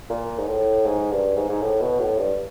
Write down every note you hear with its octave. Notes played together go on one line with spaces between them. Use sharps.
A#2
G#2
A2
G#2
G2
G#2
G#2
A2
B2
A2
G2